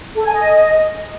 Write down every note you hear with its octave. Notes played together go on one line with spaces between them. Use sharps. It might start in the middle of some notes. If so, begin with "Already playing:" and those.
A4
G#5
D#5